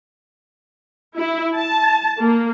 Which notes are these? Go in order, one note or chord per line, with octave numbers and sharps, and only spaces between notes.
E4
A5
A#3